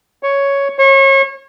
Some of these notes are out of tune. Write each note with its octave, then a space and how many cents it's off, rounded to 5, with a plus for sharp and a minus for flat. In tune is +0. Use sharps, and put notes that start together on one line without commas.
C#5 +5
C#5 -35